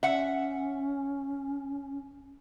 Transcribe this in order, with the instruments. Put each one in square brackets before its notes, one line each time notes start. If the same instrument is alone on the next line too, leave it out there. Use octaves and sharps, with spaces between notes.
[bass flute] C#4 [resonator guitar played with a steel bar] E5 F#5